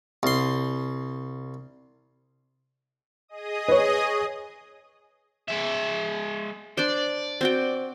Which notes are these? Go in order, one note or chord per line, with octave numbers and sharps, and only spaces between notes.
C2 C6
G#4 D#5 D#6
B4 C#5
G#3 E5
D4 C5 D5
C4 F#4 G5